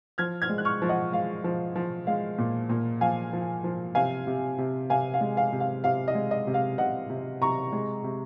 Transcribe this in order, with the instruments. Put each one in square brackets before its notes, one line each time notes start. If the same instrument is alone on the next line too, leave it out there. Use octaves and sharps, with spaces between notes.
[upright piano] F3 F6 G#6
F6 G#6
G#3
F#6
C#6 F6
F3
D#5 F#5
G#3 F5
F3
F3
G#3 F5
A#2
A#2
F3 F5 G#5
F3
F3
C3 F5 G#5
C3
C3
C3 F5 G#5
F5
G#3
F5
C3
F5
C3 F5
D#5
G#3
D#5
C3
F5
C3 D#5 F#5
C3
C3 A#5 C#6
G#3
C3